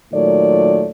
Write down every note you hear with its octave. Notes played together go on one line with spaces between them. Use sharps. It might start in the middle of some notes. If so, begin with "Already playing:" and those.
A#2 D#3 F#3 A3 C#5 D5